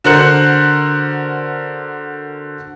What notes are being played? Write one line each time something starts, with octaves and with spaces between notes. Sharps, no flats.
D3 F#4 A#4 C5 F#6 C#7